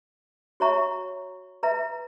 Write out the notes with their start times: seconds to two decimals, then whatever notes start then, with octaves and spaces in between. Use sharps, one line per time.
0.60 F#4 C#5 E5 A#5 C#6
1.63 B4 E5 A#5